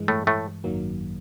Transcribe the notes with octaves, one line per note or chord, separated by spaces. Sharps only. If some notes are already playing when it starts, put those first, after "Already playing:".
Already playing: G2 E3 G#3
A2 A3
A2 A3
G#1 F#2 D#3 F#3 A#3